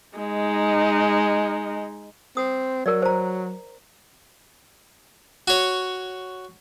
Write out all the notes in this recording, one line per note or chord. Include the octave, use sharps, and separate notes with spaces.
G#3 D#4
C4 D#6
F#3 A#4 D5
C5 A#5
F#4 C#5